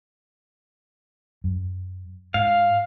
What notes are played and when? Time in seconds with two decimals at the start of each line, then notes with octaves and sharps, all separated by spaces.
1.44 F#2
2.34 G#2 F5